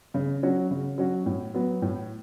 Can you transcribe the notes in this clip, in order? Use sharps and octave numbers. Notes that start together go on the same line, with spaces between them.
C#3
F#3 C#4 F#4
C#3
F#3 C#4 F#4
A2
F#3 B3
A2